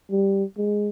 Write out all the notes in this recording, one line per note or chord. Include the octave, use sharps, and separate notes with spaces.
G3
G#3